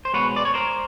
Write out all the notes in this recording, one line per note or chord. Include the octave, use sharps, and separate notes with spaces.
C5
B2 G#3 B3 B4 C#5
D5
C#5
A#4 C5